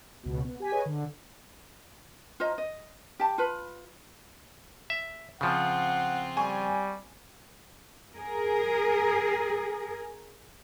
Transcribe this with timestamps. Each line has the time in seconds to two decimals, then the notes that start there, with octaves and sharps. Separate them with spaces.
0.23 C#2 B2
0.45 B3
0.60 G4 G#5 B6
0.72 G#4 B4 C#5 D#5 G#5
0.86 D3
2.40 F4 C5 D#5 A#5
2.58 D#5
3.20 G4 A5
3.38 F4 B4 B5
4.90 E5
5.41 C#3 F3 C4 F4 F#5
6.37 G3 G#5 C#6
8.16 G#4 A#4